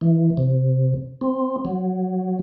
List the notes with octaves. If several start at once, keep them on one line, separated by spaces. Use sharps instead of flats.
E3
C3
C4
F#3